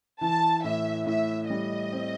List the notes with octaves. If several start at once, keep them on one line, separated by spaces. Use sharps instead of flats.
E3 A5
A2 E5
A2 E5
G3 D#5
C4